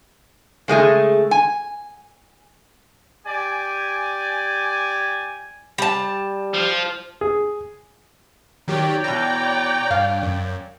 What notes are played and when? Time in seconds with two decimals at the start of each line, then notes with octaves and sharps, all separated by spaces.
0.68 C#3 G#3 A3 G#4
1.31 G#5
3.26 G4 D5 G#5
5.78 G3 A5
6.54 F3
7.21 G#4
8.68 D#3 F#3 G4 C#5 D5 G5
9.04 B2 E3 A#5
9.91 G2 F5
10.23 F#2